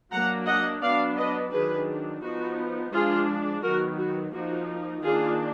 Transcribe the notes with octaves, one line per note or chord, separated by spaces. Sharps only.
F#3 A#3 D4 F#5 A#5
D#5 F#5
F#3 B3 D4 D5 F5
B4 D#5
D#3 F#3 D4 G#4 B4
F3 B3 D#4 F#4
F3 G#3 D4 F4 G#4
D#3 F#3 B3 F#4 A#4
F#4
F3 A#3 D#4 F#4
D#3 A#3 D4 F4 G#4